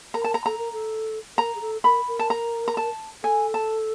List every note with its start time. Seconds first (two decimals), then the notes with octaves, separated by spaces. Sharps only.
0.14 A#4 A#5
0.24 A5
0.34 A#5
0.46 A4 A#5
0.58 A#4
0.73 A4
1.37 A#4 A#5
1.55 G#4
1.61 A4
1.84 A#4 B5
2.08 A#4
2.19 A5
2.30 A#5
2.68 A#5
2.77 A5
3.23 A4 G#5
3.54 A5